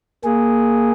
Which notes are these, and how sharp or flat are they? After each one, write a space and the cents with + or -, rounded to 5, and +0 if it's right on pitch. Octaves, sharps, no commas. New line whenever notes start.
A#3 +0 G#4 +0